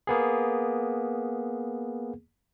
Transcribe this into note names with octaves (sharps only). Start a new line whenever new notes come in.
A#3 B3 G#4